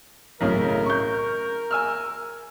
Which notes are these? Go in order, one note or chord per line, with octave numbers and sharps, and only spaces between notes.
B1 A2 C#3 A#4
C#6 G6
G#5 E6 F6